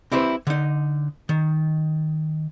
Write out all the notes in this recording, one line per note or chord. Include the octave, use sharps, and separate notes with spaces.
C4 E4 G4 B4 C5
D3 D#4
D#3